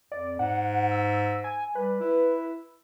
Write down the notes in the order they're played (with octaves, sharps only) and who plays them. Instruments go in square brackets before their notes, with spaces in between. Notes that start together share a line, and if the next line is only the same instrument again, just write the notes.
[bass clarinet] F2 [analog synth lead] D5
[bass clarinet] G#2 [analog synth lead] F#5
[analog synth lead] E6
G#5
[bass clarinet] G3 [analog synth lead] B4
[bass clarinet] E4